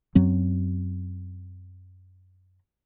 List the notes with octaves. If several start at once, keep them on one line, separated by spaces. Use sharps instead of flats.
F#2 F#3 C4